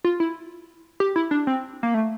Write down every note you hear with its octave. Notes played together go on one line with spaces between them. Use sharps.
F4
E4
G4
E4
D4
C4
A#3
A3